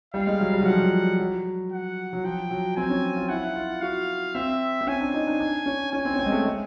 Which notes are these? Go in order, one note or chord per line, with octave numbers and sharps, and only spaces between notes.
G3 F5
G#3
F#3
G3
F#3
F3 F#5
F#3
F#3
F#5
F#3
F3 G5
F#3
C4 G#5
C#4
F4
E4 F#5
E4
F4
F#4 F5
C4 E5
C4
C#4 G#5
D4
D#4
D4
D4
C#4
C#4 G#5
C4
C#4
C4
G#3
A3
G#3